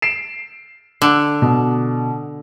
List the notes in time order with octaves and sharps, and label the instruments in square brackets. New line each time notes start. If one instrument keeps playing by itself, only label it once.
[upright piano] C7 D7 E7
[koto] D3
[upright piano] B2